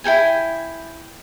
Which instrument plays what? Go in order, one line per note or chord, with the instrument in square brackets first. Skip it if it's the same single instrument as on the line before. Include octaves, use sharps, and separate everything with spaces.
[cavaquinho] E4 A4 G5 G#5